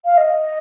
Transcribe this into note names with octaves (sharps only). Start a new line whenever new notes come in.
F5
D#5